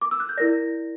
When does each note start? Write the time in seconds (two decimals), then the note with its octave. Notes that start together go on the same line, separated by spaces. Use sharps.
0.01 D6
0.11 E6
0.20 F#6
0.29 G6
0.37 E4 A#4 D5 A#6